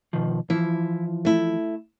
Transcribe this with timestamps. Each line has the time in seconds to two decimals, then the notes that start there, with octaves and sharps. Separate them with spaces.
0.13 B2 D#3 F3
0.50 E3 F3 E4
1.25 A3 E4